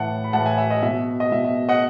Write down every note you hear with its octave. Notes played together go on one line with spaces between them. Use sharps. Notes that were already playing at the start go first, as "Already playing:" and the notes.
Already playing: A2 E3 F#5 A5
B5
A2 E3 F#5 A5
E5 G#5
E5
D#5
B2 E5
D#5
B2 E5
E5
D#5 F#5